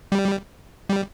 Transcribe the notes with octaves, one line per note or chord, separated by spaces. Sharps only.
G3
G3